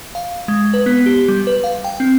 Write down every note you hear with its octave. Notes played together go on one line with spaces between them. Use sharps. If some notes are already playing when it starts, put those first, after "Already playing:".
F5
G#3
B4
B3
G4
G3
B4
F5
G5
C4